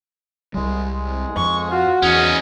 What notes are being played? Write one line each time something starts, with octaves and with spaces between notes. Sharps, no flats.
C2 G3 G#3
G#3
F2 C#6
F4 F#4
E2 C#4 D#4 G#4